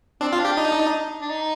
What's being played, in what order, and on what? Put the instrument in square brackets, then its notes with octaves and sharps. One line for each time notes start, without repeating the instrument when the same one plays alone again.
[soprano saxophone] C4 [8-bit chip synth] D4
[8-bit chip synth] F4
[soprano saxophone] D4
[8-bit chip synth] G4
D#4
[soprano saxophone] D4
D#4